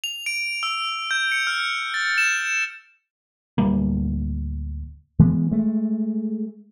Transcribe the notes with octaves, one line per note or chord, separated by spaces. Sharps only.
F7
D7
E6
G6
C#7
F6
A6
E7
D1 D2 G3 A#3
E3 G#3 B3
G#3 A3